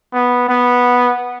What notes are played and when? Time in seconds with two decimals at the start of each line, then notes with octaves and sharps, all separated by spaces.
0.13 B3
0.49 B3